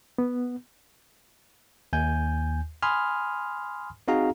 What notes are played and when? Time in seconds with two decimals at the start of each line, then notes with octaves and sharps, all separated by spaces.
0.18 B3
1.93 D#2 G#5 G6
2.83 G#5 B5 C6 D#6 F6
4.08 C4 D#4 F#4 G#4 F5 A#5